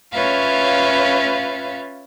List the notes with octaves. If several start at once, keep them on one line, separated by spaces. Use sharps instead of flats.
C#4 F4 B4 C#5 E5 F5